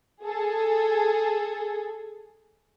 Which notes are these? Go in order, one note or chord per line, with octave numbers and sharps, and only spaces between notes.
G#4 A4